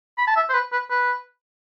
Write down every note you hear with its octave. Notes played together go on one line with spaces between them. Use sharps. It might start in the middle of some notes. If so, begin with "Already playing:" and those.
B5
A5
E5
C5
B4
B4
B4